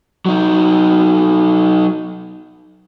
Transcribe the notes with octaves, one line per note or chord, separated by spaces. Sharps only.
F#3 D#4